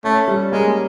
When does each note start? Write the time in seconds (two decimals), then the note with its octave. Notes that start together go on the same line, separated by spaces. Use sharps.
0.04 A3 C#4
0.28 G3
0.52 G#3 A#3